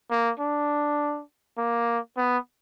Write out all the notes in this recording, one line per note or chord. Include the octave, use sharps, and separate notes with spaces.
A#3
D4
A#3
B3